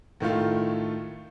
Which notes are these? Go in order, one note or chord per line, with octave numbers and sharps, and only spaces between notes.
A2 D#3 A3 F4